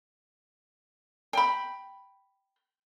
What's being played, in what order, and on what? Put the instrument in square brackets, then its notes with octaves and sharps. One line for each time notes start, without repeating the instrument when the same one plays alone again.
[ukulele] G5 B5